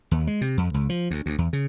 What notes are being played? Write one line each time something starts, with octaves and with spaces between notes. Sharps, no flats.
D#2
G#3
C3
F2
C#2
F3
D2
D2
E2
C#3